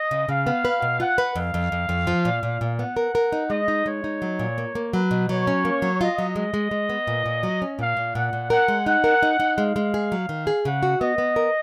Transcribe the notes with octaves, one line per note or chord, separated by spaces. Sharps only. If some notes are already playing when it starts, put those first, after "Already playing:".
Already playing: D#5
C#3
C#3 F5
B3
B4
B2
F4 F#5
B4
F2 F5
F2
F2
F2
F3
A#2
A#2
A#2
B3 F#5
A#4
A#4
D#4
G#3 D#5
D#4
G#3 C#5
D#4
F#3
A#2
A#3
A#3
F#3 B4
B2
F#3 C#5
C#4
A#3
F#3
F4 D#5
F#3
G#3 D#5
G#3
G#3
B3
A#2
A#2
F#3
C#4
A#2 F5
A#2
A#2 F#5
A#2
A#4 F#5
G#3
D#4 F#5
A#4
D#4
D#4
G#3 F5
G#3
G#4
F#3
D#3
G#4
C#3 F#5
F#4
B3 D#5
B3
A#4